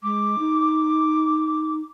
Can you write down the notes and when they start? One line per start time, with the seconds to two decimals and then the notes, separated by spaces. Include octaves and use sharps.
0.03 G#3 D6
0.39 D#4